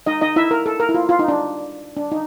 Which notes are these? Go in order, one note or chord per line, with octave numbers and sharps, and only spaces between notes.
D#4 D#5
D#4 D#5
E4 E5
A#4
A4
A#4
E4
F4
F4
D#4
D4
D4
D#4